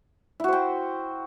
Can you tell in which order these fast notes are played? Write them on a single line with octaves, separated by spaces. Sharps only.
E4 F#4 C5 G5